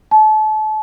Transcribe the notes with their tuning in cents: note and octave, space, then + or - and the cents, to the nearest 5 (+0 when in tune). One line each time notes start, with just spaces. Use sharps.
A5 -35